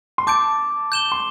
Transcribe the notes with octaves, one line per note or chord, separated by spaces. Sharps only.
C6
A5 D6 G6 D7
G6 E7 G7
C6